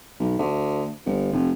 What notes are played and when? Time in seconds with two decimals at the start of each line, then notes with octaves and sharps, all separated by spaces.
0.20 B1
0.38 D2
1.06 G1
1.32 F1